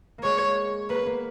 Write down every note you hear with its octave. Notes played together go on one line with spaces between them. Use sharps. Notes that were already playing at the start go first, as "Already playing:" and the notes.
A#3
G#3 C#5
A#3 B4
B3
A#3